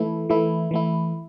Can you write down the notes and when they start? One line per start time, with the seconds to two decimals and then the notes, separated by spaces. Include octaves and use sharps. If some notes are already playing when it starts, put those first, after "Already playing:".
Already playing: E3 A3 E4
0.29 E3 A3 E4
0.71 E3 A3 E4